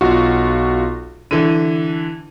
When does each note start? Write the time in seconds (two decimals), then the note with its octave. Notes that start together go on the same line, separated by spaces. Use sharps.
0.01 B1 F4 F#4
1.31 D3 E3 D#7